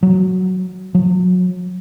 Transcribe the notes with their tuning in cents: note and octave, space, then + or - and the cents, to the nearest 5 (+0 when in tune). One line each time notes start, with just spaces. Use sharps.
F#3 +5
F#3 -30